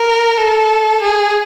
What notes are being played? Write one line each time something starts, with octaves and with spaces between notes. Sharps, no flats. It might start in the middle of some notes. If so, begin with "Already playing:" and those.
Already playing: A#4
A4
G#4